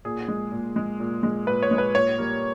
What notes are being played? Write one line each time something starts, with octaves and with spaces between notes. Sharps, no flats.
A#2 G#4
G#3
A#2
G#3
A#2
G#3
A#2 B4
C#5
G#3
B4
A#2 C#5
G3 A#3